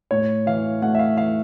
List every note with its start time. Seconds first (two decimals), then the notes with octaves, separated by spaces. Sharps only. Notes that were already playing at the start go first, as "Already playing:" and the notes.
0.11 A2 C#5
0.46 E3 F5
0.82 A3 F#5
0.95 E5
0.99 F5
1.17 E3 F5